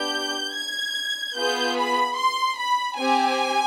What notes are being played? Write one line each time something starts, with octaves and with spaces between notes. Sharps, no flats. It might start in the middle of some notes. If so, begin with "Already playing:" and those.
Already playing: B3 D4 G4 G6
G#6
B3 F4 G#4 G6
B5
C6
B5
C4 G4 G#5